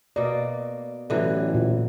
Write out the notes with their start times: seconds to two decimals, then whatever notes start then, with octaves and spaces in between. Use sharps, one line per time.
0.16 B2 A#3 D5
1.10 A1 D3 E3 F#3
1.54 A#2